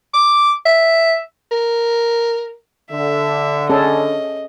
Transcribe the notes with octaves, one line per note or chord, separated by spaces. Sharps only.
D6
E5
A#4
D3 E5
C#4 G#4 A4 D#5